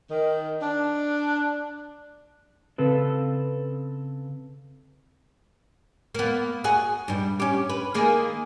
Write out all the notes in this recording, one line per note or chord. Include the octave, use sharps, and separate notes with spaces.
D#3
D4
C#3 C4 A4 B4
A#3 B3
F#4 G#4
G2 G3
C#4 G4
B4
D#3 A#3 G#4